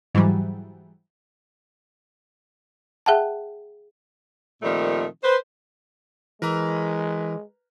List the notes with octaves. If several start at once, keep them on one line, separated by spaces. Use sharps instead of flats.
G#2 E3 F#3 G3
G#4 E5 F#5 G5 A5
A#2 D#3 F3 G3 A3 C4
B4 C5
E3 G#3 A#4 B4 A#5